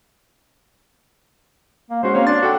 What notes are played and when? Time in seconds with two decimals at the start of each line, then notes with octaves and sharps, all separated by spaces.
1.91 A#3
2.03 G#3 C#4 F#4 C5
2.15 A#3 C4 C#4 C#5
2.27 D4 C6 A6
2.42 F#4 A4 G5